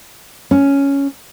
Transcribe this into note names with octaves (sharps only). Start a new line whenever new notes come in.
C#4